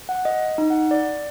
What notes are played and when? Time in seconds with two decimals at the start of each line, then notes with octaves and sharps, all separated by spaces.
0.09 F#5
0.25 D#5
0.58 D#4
0.70 F#5
0.91 D5